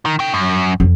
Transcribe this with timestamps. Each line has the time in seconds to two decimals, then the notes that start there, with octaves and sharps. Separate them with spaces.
0.05 D#3
0.19 C#3 G5
0.34 F#2
0.80 F2